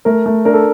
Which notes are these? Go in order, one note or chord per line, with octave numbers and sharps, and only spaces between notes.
A3 A#4
A3
D4 A#4
A4